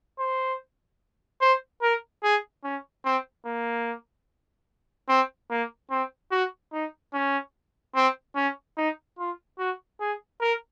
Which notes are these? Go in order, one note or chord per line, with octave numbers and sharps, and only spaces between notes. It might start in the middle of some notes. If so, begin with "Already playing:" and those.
C5
C5
A#4
G#4
C#4
C4
A#3
C4
A#3
C4
F#4
D#4
C#4
C4
C#4
D#4
F4
F#4
G#4
A#4